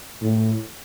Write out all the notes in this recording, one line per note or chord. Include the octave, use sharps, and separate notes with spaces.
A2